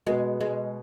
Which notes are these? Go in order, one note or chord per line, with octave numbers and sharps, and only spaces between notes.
B2 G#3 B3
G#3